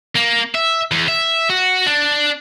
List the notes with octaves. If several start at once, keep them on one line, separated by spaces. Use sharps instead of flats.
A#3
E5
E2
E5
F#4
D4